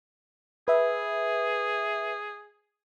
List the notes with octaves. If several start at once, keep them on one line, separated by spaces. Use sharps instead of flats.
G#4 B4 E5